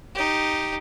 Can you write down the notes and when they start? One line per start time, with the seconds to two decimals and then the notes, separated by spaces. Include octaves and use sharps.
0.15 D#4 G4